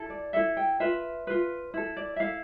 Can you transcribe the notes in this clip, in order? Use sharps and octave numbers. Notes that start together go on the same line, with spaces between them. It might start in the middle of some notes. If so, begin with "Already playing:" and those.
Already playing: E4 A4
D5
E4 A4 E5
G5
F4 B4 E5
F4 B4
E4 A4
D5
E5
E4 A4 F5